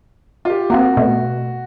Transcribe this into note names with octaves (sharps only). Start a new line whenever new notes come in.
F4 G4
A#3 C4 F#4
B2 A3